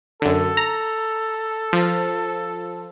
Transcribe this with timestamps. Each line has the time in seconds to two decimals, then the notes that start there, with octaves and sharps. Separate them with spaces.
0.22 F#2 D3 A4
0.57 A#5
1.73 F3